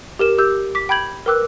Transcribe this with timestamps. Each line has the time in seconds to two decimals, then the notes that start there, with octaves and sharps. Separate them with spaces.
0.19 G4 A#4 E7
0.38 G4 E6 G6
0.75 D6 B6
0.89 G5 B5 G6 G#6 F#7
1.26 A#4 B4 G5 D6 E6 F#6